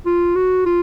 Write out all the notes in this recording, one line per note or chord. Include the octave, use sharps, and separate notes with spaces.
F4
F#4
F4